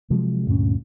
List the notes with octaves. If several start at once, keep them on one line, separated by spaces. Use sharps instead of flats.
C3 F3 F#3 G#3
D2 G2 A#2 C#4